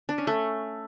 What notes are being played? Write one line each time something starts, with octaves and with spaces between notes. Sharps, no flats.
D4
C#4
A3